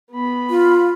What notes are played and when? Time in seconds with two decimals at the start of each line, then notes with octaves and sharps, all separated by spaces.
0.12 B3 B5
0.50 F4